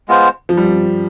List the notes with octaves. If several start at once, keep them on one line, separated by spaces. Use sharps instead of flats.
G#3 B3 F4 C5
F3
G3